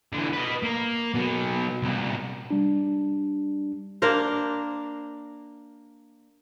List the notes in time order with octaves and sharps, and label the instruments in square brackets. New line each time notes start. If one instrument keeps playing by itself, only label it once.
[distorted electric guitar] D3 E3
B4 D#5
A#3
B2 F#3
C2 A#2
[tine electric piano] G3 D4
[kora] A#3 D4 A#4 C5